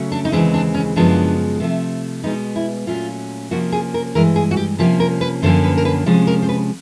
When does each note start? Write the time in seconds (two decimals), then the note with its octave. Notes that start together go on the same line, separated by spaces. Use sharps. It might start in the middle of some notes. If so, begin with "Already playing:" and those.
Already playing: C#3 F#3 A3 C#4
0.12 D4
0.25 D#4
0.32 D#2 C#3 E3 G#3 C4 D4
0.54 D4
0.74 C#4
0.96 F#2 C#3 F3 G#3 B3 D4
1.60 C3 F3 A3
2.23 B2 G#3 B3 D#4
2.56 E4
2.87 A#2 F#3 A3 C#4 F4
3.51 C3 F3 A#3 C#4 F#4
3.72 G#4
3.94 A#4
4.15 G2 E3 G#3 A#4
4.36 G#4
4.51 F#4
4.57 G4
4.79 C3 F3 A#3 C#4 G4
5.00 A#4
5.21 B4
5.42 F#2 D3 F3 A#3 C#4 C5
5.64 B4
5.77 A#4
5.85 B4
6.06 C3 F3 G#3 C#4
6.27 A#4
6.42 C5
6.49 B4